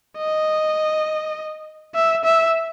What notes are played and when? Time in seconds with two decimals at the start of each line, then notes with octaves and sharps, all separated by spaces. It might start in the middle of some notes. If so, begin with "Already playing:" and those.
0.18 D#5
1.95 E5
2.24 E5